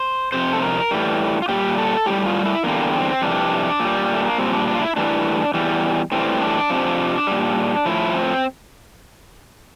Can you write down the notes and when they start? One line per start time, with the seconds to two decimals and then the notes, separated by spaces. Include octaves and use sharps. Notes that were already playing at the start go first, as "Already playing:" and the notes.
Already playing: C5
0.32 F2 C3 C5
0.53 A4
0.62 A#4
0.91 A2 E3 G3
1.42 F4
1.49 A#2 G3 G4
1.78 A4
2.06 A2 G3 G4
2.26 F4
2.45 E4
2.64 E2 D3 G3 A#3
2.93 C4
3.22 F2 C3 E3 G3 D4
3.80 A#2
3.85 G3
4.14 A3
4.25 A#3
4.38 A#2 G3 C4
4.53 D4
4.67 D4
4.75 F4
4.82 E4
4.96 A2 E3 G3 D4
5.54 E2 E3 G3
6.12 A2 E3 G3 C4
6.41 D4
6.70 F2 C3 F3
7.27 A#2 G3
7.86 A2 F3 E4
8.15 C4